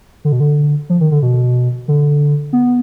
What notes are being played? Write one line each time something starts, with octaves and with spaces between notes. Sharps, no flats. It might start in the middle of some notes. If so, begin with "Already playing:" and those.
D3
B2
D3
F3
D#3
D3
B2
D3
B3